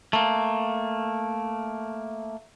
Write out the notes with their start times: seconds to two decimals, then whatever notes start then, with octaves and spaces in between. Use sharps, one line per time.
0.13 A3 A#3